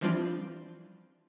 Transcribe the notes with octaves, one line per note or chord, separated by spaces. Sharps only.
E3 F3 G3 C4 D4 F4